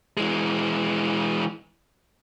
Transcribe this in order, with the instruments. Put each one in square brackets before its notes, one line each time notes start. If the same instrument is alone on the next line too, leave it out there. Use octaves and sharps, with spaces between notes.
[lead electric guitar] E3 G#3